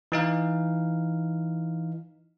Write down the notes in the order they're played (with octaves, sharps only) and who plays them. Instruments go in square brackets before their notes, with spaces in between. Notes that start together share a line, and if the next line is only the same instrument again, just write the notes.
[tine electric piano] E3 D#4 F5